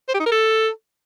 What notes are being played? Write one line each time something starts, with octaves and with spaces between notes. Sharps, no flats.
C5
G4
D#4
A#4
A4